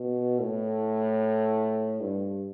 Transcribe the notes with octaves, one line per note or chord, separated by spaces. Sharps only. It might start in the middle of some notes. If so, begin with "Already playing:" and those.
Already playing: B2
A2
G2